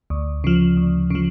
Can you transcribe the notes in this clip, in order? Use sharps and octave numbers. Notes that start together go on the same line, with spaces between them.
D2
C#3 F3
D2
C#3 F3